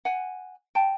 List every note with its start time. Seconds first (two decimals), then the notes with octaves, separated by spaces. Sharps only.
0.05 F#5 G#5
0.75 G5 A5